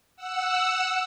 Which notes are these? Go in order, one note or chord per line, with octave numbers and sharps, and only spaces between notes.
F#5 E6